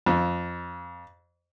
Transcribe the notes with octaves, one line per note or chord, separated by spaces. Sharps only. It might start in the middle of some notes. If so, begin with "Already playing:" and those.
F2